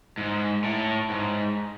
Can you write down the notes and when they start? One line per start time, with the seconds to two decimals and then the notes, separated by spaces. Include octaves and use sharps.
0.18 G#2
0.64 A2
1.10 G#2